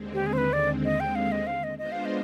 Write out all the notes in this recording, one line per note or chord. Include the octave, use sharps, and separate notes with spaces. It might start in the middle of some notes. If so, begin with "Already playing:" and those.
Already playing: D#2 D3 G#3 C4
G4
G#4
C5
B4
D5
D#5
G5
F5
D#5
F5
D#5
G#3 B3 D4 F4 C5 D#5
F5
D#5